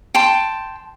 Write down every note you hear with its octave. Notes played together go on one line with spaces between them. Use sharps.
G5 A5 C6